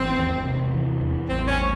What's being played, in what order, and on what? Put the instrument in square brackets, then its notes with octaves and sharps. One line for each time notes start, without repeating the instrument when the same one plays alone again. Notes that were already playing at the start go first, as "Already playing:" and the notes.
Already playing: [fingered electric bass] G#1 E3 [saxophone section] C4
[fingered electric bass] E2
C3
E3
E2
[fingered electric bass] A1 [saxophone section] C4
[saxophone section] C#4
[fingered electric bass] A2